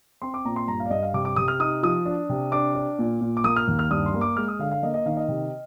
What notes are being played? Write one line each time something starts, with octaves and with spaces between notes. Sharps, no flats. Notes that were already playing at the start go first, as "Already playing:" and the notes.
C4 C6
D6
A#2 A#5
C6
G2 A#5
F5
D5
G2 D#5
F5
C3 D6
D6
C3 D#6
F6
D#4 D#6
F3 D#6
D4
C3
D4 D6
D4
A#2
A#2
D6
A#3 D#6
F6
D#2
F6
G2 D#6
C6
A#3
D6
G#3 F6
D#6
D3 F5
F5
A#3 D#5
D#5
D#3 F5
D#5
C3